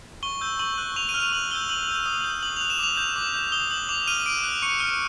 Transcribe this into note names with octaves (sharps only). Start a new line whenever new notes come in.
C#6 G7
E6 G6
C#6 F#7
F#6
C#6 F7
D#7
F6
F7
C#6 F#7
E6 G6 G7
C#6 F#7
E6 G6
D#6
G6
D#6 F#7
F#6 F7
E7
D6 F7
G6
D6
G6
D#6 G7
G6 F#7
D6 F7
F6 D#7
D6 D7
F#6
C#6 C#7
F6